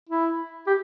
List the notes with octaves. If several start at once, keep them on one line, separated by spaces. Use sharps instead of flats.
E4
G4